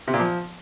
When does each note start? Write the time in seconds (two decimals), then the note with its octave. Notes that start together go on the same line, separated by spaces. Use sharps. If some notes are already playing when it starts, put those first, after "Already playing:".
0.08 C3
0.14 A#2
0.20 F3